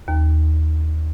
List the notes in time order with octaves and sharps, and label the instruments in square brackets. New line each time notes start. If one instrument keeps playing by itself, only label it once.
[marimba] D#2